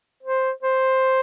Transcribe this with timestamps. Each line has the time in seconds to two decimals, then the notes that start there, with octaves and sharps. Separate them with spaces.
0.23 C5
0.63 C5